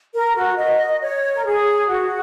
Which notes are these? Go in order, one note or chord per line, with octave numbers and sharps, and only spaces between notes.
A#4
F#4
D#5
C#5
A#4
G#4
F#4